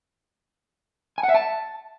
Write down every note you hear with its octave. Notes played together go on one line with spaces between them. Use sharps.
G#5
F#5
E5
A5